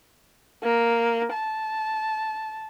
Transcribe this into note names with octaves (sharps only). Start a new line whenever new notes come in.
A#3
A5